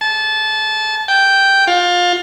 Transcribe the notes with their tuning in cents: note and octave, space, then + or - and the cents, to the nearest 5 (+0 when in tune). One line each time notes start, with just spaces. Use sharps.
A5 -20
G5 -5
F4 +20